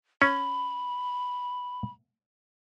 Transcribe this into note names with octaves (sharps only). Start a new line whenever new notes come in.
C#4 B5